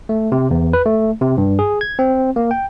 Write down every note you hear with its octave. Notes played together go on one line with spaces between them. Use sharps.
A3
C3
E2
B4
A3
C3
G2
G#4
G#6
C4
A#3
G5